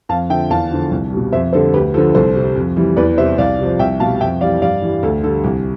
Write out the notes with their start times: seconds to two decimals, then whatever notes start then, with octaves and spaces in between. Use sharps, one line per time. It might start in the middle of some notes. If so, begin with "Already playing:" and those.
0.09 F2 F5 A5
0.30 D3 F3 E5 G5
0.50 E2 F5 A5
0.70 D3 F3
0.91 C2
1.11 G3
1.17 B2
1.32 F2 C5 E5
1.53 D3 G3 A4 C5
1.74 D2 G4 B4
1.94 F3 A4
1.97 D3
2.15 C2 A4 C5
2.35 C3 G3
2.56 F2
2.76 E3 G3
2.96 E2 B4 D5
3.18 C3 G3 C5 E5
3.38 C2 D5 F5
3.59 C3 F3
3.79 C2 E5 G5
4.00 B2 G3 F5 A5
4.20 F2 E5 G5
4.41 E3 G3 D5 F5
4.61 G2 D5 F5
4.82 E3 G3
5.03 D2 A4
5.24 D3 A4
5.26 G3
5.44 C2 G4